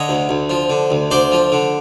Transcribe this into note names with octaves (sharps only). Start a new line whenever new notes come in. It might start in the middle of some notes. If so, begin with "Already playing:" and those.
Already playing: D3 C#5 D#5
D2
D2
F3
D3
D2
D2 C5 D5
F3
D3